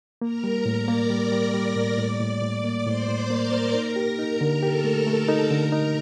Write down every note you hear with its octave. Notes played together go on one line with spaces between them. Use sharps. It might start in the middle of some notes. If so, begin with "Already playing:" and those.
A#3 A#4 A#5
G3
A2
D5 D6
A#3
G3
G3
G3
A2
A2
A2
A2
A#3
A2 C5 C6
A2
A#3 A#4 A#5
A#3
D#4
G4
D#4
D3
G4 A4 A5
A3
A3
D#4
D3 A#4 A#5
D#4